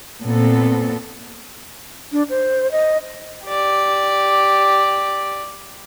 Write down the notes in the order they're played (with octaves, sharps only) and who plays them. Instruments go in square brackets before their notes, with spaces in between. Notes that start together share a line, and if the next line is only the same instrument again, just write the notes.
[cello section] A#2 B3 C4 A4
[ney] D4
C5
D#5
[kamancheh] G4 D5